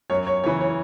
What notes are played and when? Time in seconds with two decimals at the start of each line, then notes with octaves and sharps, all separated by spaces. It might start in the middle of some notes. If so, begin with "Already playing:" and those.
0.10 F#2 C#5
0.27 C#5
0.44 C#3 E3 C#5
0.61 C#5